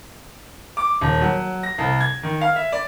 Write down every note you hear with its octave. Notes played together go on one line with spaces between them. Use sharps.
D6
D#1
F#3
A#6
C2
G#6
D#3
F5
E5
D5